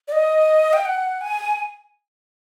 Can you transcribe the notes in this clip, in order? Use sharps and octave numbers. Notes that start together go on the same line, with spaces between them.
D5
D#5
G5
F#5
G#5